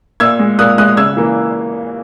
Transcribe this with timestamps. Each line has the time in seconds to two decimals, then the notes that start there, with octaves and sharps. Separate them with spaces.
0.20 A#2 E6 G#6
0.39 G#3
0.59 A#2 D#6 F#6
0.78 G#3 D#6 F#6
0.97 C#3 E6 G#6
1.17 E3 A#3